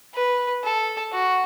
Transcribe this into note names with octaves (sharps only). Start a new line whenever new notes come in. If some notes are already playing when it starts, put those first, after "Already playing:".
B4
A4
F#4